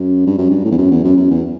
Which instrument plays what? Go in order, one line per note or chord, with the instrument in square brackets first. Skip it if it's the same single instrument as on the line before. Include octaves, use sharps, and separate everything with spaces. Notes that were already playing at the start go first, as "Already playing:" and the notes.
Already playing: [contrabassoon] F#2
G2
F#2
G2
A2
E2
F#2
E2
F#2
F#2
E2